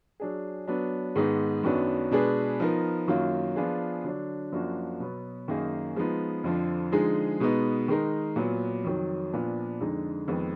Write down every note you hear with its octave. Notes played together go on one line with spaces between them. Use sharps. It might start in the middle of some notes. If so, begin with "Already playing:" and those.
F#3 D4 G#4
F#3 B3 D4
G#2 D#3 G#3 B3 D#4
F#2 D#3 F#3 B3 D4
B2 G#3 D4 G#4 B4
F3 B3 D#4 A#4
F#2 D#3 F#3 A#3 F4
F3 B3 D4 F4 G#4
D3 F#3 D4
F#2 F3 A#3 D4 F#4
B2 F#3 B3
F#2 D#3 A#3 D#4 G#4
F3 G#3 B3 D#4
F2 D3 F3
D3 F3 G#3 D#4 G#4
B2 G#3 B3 D#4
D#3 G#3 D#4 A#4
A#2 F#3 B3
F2 D#3 F#3
A#2 F3 B3 D4
F2 D3 G#3 D#4
F2 D#3 G#3 B3